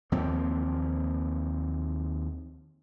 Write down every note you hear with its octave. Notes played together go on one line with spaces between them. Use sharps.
D#2 F3 A#3 C4